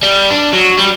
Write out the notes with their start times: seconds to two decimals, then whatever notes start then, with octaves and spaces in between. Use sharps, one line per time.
0.03 G3
0.30 D4
0.53 F#3
0.77 G3